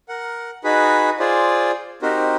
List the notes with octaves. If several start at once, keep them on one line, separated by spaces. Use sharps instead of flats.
A#4 F#5
D#4 F#4 G#4 B4 B5
F4 G#4 C5 D5
C4 D#4 F#4 G4 A#4 C5